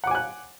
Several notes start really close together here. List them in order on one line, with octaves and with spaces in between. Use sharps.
F#5 D6 G#5 F#6